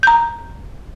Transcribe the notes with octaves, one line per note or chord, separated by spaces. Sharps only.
A#5 G6